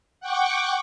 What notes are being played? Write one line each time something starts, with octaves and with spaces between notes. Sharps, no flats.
F#5 G5 C#6 D6